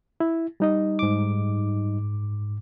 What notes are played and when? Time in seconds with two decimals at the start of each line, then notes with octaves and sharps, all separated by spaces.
0.20 E4
0.60 G3 D#4 D#5
0.99 G#2 D6